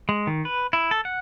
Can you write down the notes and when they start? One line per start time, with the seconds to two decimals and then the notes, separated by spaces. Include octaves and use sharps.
0.09 G#3
0.27 D#3
0.45 B4
0.73 E4
0.91 A4
1.05 F#5